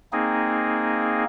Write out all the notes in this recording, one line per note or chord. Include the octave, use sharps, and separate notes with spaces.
A#3 C4 D#4 G#4